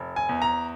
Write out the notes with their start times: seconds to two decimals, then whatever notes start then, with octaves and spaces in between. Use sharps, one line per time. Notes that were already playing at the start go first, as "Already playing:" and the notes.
Already playing: F1
0.16 G#5
0.29 E2
0.42 A#5